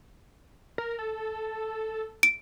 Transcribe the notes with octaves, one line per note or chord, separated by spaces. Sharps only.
A#4
A4
D7